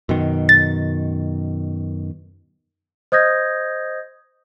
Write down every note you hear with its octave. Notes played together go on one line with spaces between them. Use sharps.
F#2 B2 D#3
A6
C5 D#5 D#6 G6 G#6 A#6